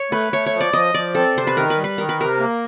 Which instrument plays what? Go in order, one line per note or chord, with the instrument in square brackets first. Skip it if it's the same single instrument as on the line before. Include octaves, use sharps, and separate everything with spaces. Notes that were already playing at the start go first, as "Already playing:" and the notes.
Already playing: [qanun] C#5
[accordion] A3 [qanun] B4
[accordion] A3 [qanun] C#5
[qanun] C#5
[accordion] F3
[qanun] D5
[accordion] F3 [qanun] D#5
[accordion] F3 [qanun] D5
[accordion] C4 [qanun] A4
[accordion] C3 [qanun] C5
[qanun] B4
[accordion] D#3 [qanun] A#4
[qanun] B4
[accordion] G3
[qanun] B4
[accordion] D#3 [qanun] A#4
[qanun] B4
[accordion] C3 [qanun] A#4
[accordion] A#3